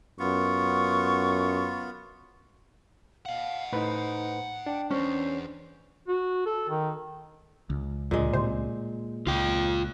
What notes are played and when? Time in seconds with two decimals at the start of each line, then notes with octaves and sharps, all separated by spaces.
0.19 F#2 B3 F4 C#6
3.26 D#5 F5 F#5
3.72 A2 D#4 B4 C5
4.66 D4 G5
4.90 E2 C#4 C5
6.08 F#4
6.46 A4
6.70 D#3
7.70 C#2
8.11 D2 A#2 G#3
8.33 A2 C3 C5
9.27 C#2 F4 G5